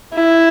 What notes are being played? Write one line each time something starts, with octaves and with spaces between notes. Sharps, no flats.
E4